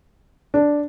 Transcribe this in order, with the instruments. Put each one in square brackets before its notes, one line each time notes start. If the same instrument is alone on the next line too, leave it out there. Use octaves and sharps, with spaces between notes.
[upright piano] D4